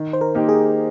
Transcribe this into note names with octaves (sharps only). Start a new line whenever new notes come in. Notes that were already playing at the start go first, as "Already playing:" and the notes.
Already playing: D#3
C5
A#4
A#3 D#4 G4
G#4